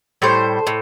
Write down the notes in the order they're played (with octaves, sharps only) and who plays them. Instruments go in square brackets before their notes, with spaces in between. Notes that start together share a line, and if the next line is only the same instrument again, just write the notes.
[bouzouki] A2 G3 C5
A2